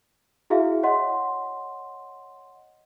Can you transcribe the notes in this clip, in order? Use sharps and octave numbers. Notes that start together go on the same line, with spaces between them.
E4 F#4 G#4 E5 F5
C#5 D#5 F#5 C6